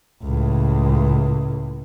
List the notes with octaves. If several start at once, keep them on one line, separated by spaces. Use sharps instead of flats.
C#2 A2